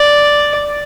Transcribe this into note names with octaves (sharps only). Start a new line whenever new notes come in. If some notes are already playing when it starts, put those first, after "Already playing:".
Already playing: D5